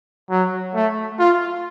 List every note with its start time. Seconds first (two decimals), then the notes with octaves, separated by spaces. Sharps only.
0.30 F#3
0.75 A3
1.19 F4